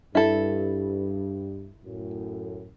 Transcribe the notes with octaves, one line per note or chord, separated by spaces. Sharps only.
G2 E4 A4
F#2 A2